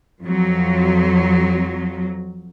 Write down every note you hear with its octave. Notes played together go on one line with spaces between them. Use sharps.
F2 F#3